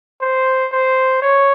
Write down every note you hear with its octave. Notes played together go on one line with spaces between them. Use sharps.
C5
C5
C#5